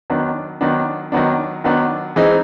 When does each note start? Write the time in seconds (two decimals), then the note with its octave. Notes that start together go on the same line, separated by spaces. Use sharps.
0.10 D#3 F#3 B3 D4
0.61 D#3 F#3 B3 D4
1.12 D#3 F#3 B3 D4
1.64 D#3 F#3 B3 D4
2.16 E3 G#3 C4 D#4